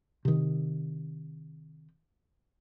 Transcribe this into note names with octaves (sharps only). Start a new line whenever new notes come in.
C3 D#3